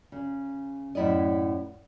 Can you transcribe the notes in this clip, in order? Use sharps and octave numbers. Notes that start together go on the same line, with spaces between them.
C#3
F#2 A2 E4 D5 D#5